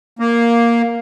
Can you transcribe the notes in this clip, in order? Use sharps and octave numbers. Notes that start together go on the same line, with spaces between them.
A#3